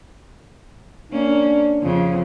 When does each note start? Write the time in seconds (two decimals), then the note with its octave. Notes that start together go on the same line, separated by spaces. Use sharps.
1.12 A#3 C#4 D4
1.83 F2 C#3